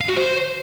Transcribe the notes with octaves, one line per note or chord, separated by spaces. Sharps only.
F5
F#4
C5